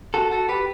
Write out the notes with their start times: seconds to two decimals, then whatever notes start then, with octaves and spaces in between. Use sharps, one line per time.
0.14 F#4 A4
0.31 F#4 A4
0.49 G4 B4